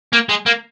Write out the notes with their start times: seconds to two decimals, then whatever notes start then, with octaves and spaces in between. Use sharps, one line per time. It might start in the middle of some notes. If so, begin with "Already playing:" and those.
0.13 A#3
0.29 G#3
0.46 A#3